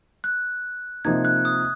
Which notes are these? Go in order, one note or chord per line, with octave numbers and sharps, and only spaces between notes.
F#6
C3 F3 A#3 D#4 G#6
F#6
D#6